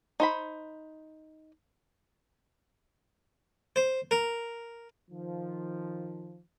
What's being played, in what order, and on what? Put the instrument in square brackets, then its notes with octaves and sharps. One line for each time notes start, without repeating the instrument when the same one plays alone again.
[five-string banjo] D#4 C5 B5
[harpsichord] C5
A#4
[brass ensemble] D#3 F3